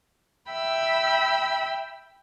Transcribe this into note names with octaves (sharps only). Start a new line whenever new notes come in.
E5 G5 B5 E6